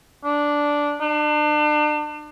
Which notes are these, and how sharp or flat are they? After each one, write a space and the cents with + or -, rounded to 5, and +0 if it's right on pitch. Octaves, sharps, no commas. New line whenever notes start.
D4 -5
D4 +35